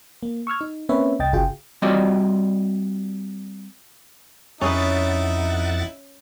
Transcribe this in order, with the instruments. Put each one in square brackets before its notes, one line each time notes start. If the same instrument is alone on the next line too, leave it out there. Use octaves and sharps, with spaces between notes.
[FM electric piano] A#3
C#6 E6 F6 G#6
D#4
A#3 C4 C#4 B4 C#5 E5
C2 D#5 G5 A6
G1 C#3 F4 F#4 G#4 G5
[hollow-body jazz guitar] G3 C4 F4 F#4 D5 D#5
[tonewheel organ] F2 F#5 A6 [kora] C#4 G#4 B4 [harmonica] D#4 E4